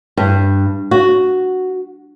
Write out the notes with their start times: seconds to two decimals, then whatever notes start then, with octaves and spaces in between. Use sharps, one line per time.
0.17 G2
0.91 F#4